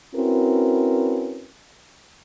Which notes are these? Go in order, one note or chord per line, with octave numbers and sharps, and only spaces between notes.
C4 C#4 E4 F#4 A#4 B4